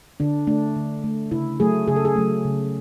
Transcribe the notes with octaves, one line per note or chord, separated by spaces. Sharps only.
D3 D4
A3 D4
D3
A3
C#3 E4
F#3 A3 G#4
C#3 G#4
A4
G#4
F#3 A3
C#3